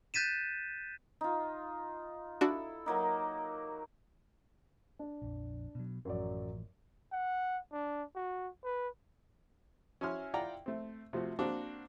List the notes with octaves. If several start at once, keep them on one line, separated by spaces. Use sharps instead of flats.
F#6 G6 A6 B6 D#7 E7
D#4 F4
D4 E4 F#4 A4
F#3 A#3 D#4
D4
A#1 F2
B2 F#3
A1 F#2 F3 F#3 D5
F#5
D4
F#4
B4
C#4 E4 F#4 G#5 C6 F6
E4 F4 D5 F#5 G5 A#5
A3 C4
C3 F3 A3 F#4
A#3 C4 D4 F#4